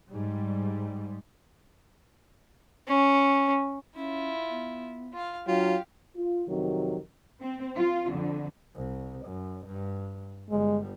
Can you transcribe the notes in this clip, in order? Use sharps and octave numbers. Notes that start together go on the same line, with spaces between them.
G#2 G3
C#4
C#4 E4 F4
B3
F4 F5
F#3 D4 F4 G4 F5
F4
F2 C3 D#3 F#3
C4
F4
F2 D3
C2
F#2
G2
G1 G3 G#3